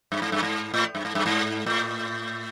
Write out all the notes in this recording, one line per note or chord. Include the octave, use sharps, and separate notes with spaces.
G2
G#2
G2
G#2
A2
G2
G#2
G2
G#2
A2